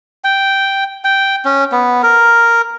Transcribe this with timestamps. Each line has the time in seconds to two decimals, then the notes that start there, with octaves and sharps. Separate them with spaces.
0.24 G5
1.04 G5
1.45 C#4
1.72 B3
2.03 A#4